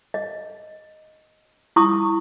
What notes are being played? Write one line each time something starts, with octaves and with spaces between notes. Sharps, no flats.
D#5
E4 C#6 D#6